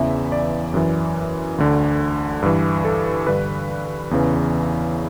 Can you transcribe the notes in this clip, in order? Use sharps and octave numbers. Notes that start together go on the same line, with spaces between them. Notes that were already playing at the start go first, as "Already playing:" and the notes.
Already playing: E2 C#3 E3 E5
D5
F#2 E3
D2 D3
G2 E3
A4
G2 D3 B4
E2 C#3 E3